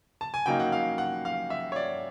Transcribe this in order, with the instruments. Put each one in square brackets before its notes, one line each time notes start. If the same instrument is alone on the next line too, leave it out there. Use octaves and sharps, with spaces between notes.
[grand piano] A5
G#5
C#3 F#3 A#3 D#4 G5
F#5
F5
F#5
F5
E5
C#5
D5